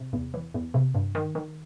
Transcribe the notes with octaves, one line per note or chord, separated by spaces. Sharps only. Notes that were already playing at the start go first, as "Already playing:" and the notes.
Already playing: C3
E2
E3
E2
C3
G2
D#3
D#3